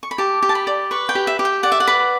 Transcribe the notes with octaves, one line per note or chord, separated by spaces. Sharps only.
C#6
B5
G4 A5
G4
A5
B5
D5
B4 C#6
G5
G4
E5
G4
G5
D5 F#5
E5
F#5
B4